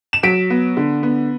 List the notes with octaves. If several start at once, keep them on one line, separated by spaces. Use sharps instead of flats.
E7
F#3 B6 D7
B3
D3
B3